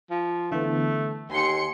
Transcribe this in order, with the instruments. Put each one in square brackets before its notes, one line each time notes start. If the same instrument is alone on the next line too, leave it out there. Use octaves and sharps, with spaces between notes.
[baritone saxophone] F3
[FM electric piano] D3 E3 B3 [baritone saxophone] A3
[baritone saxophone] D#2 [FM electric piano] G#5 [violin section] C6 C#7